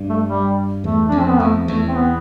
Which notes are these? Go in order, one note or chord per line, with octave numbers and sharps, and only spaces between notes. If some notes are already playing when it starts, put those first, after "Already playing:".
Already playing: G2
A3
G3
E2 A3
F2 D4
C4
B3
F2 A3
E2 A3
C4
B3